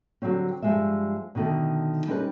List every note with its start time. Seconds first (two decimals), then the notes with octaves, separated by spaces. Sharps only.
0.22 D3 F#3 G3 C4 C#4
0.62 G2 F3 G3 G#3 C4 E5
1.35 B2 D3 D#3 A3
2.08 G3 C#4 D#4 E4 A#4 B4